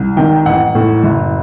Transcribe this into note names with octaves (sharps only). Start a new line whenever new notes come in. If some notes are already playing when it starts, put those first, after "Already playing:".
Already playing: C2
C3 D#3 G5
A1 F#5
A2
F#1